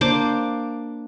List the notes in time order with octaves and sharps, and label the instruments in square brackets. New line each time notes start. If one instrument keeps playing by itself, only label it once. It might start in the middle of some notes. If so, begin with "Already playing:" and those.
[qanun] A#3 D4 C5 D6